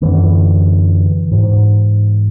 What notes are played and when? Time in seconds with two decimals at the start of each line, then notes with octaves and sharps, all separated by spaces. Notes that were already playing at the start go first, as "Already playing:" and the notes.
0.02 F#2 D3 E3
1.31 G#2